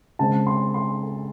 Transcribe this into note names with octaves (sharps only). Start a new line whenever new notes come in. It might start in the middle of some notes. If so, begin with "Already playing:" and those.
C#3 G#3 C4 A5
C6
C6